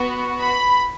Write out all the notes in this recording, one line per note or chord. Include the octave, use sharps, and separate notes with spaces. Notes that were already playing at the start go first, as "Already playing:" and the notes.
Already playing: B3 F#4
B5